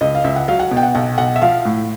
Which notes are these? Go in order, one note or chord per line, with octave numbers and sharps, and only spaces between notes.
C#2 D#5
F5
C#2 E5
F#5
F#3 F5
F#5
B2
G5
F#5
B1 F#5
B1 F#5
E5
F3 F5
A2